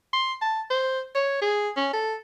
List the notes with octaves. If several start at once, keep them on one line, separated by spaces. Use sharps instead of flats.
C6
A5
C5
C#5
G#4
C#4
A4